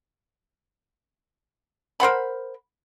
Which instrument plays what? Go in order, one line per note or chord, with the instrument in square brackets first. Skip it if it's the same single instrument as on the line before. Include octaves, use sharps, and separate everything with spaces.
[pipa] A#4 C5 F#5 B5